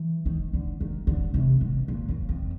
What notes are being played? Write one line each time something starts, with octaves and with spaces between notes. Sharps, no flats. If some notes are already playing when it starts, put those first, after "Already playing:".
Already playing: E3
D#3
D3
D#3
D3
C3
B2
A#2
F#2
F2